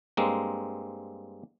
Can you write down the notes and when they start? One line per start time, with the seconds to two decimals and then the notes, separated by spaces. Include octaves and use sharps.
0.17 G2 G#3 A#3 C4